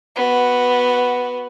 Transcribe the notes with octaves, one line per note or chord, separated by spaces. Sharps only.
B3 F#4